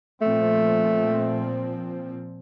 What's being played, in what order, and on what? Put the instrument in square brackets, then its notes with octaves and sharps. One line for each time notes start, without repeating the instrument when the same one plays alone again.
[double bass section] A#2 F3 C4 [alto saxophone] A3